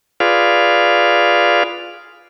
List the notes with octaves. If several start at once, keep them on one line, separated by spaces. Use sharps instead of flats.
F4 G#4 B4 D5 F5